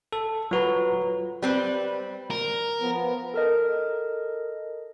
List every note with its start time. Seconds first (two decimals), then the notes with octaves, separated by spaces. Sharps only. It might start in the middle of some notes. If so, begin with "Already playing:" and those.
0.13 A4
0.51 F#3 F4 F#4 B4 A#5
1.42 G3 C4 B4
2.31 A#4
2.79 F3 B3
3.34 A4 A#4 D#5